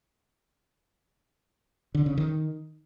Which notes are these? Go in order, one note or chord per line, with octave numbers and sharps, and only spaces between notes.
D3
C#3
D#3